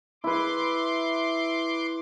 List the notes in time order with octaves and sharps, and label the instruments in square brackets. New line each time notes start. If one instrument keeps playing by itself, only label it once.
[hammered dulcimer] E4 B4 [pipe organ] C6 D6